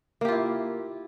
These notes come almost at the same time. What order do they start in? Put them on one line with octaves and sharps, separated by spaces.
A#3 G4 F4 E4